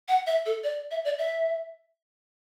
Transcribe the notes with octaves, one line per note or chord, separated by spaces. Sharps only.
F#5
E5
A4
D5
E5
D5
E5